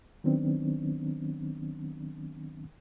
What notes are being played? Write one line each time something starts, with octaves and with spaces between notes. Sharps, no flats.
D#3 F#3 B3 C4 D4